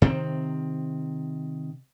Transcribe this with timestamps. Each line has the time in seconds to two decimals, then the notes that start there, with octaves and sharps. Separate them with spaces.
0.02 C3 D#3 C4